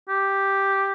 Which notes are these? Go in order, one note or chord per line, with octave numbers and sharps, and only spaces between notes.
G4